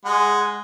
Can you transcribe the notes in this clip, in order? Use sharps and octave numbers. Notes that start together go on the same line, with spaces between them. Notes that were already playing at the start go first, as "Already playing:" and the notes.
G#3 G#4 F#5